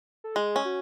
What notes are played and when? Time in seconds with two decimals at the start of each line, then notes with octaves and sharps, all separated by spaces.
0.24 A4
0.35 G#3 G#4
0.56 C#4
0.65 F#4